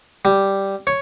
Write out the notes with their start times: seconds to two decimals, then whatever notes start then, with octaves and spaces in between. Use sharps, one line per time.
0.25 G3
0.87 C#5